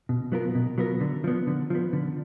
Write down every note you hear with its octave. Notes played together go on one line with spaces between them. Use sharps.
B2
F#3 B3 F4 A#4
B2
F#3 B3 F4 A#4
D3
F3 B3
D3
F3 B3
D3